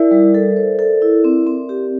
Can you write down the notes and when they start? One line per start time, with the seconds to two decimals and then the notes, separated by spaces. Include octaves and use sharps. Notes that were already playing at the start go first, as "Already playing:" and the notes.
Already playing: E4 A#4 D5 E5
0.11 G3
0.34 A4
0.57 C5
0.79 A4
1.02 E4
1.24 C4
1.47 C4
1.69 G4